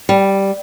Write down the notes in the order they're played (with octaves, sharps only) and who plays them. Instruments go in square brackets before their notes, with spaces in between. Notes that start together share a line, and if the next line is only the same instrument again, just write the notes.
[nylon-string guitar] G3